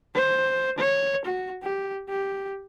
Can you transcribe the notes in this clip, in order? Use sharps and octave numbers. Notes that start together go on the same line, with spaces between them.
C5
C#5
F#4
G4
G4